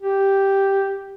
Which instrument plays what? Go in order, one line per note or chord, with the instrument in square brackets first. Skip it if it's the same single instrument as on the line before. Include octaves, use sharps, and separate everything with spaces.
[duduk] G4